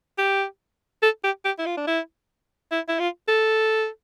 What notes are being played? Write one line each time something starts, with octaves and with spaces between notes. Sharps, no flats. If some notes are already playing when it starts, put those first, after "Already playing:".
G4
A4
G4
G4
E4
F4
D4
E4
E4
E4
F4
A4